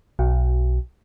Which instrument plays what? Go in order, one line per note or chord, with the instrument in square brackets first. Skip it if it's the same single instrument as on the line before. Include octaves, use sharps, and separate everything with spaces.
[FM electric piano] B1